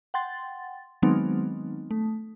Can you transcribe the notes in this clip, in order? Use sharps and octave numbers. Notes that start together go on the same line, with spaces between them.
F#5 G5 C6 A6
D#3 F#3 G#3 B3 C4 D#4
A3